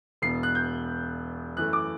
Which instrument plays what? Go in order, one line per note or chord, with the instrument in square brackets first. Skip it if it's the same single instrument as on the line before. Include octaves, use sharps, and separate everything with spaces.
[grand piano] E1 E2 B2 C7
F#6
G6
F#2 E3 A3 F#6
D6